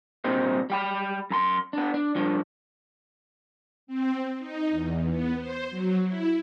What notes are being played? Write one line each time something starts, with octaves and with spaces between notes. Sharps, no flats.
G2 A#2 G3 C4 D#4 C5
G3 G5 B5
F#2 A#5 C6
B3 D4
D4
G2 F3 D4
C4
D#4
E2
B3
C5
F#3
E4